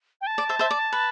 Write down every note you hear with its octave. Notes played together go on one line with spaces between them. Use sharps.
G5
A5
D5
C5 E5
C5 E5
D5
B4